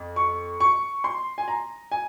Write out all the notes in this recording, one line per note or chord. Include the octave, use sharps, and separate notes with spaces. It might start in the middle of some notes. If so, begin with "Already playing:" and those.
Already playing: F2
C#6
C#6
C6
G#5
A#5
G#5